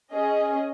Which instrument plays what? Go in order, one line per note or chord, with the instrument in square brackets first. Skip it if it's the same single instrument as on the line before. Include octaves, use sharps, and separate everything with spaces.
[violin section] C#4 G#4 D#5